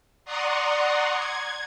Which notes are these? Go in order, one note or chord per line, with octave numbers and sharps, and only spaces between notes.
D5 F#5 A#5 C6 C#6 D#6
G#6